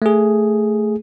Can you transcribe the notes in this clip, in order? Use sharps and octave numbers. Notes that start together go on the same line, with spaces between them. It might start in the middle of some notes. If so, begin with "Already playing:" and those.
A3 G#4